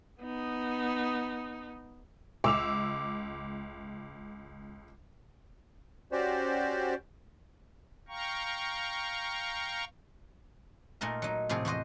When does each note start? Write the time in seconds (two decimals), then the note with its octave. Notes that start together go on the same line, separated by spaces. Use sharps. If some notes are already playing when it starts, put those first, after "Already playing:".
0.20 B3 D#4
2.44 C#2 D6 E6 F7
6.12 C#4 F#4 G4 C5 D5
8.08 F5 G5 A#5 C#6
11.01 A#2 A3 D#4 A#4
11.22 F#3 D#4
11.49 A2 C3 F3 G#4
11.65 E2 F#4 C5 D#5